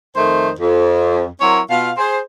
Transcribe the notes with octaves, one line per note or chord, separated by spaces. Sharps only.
F2 D#3 A3 C5
F2
F#3 C4 E4 A#4 C#5
B2 F4 F5
G#4 C5